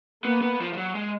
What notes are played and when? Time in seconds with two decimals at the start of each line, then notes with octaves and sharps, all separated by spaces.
0.24 A#3 B3
0.41 B3
0.60 F3
0.73 F3
0.77 F#3
0.95 G#3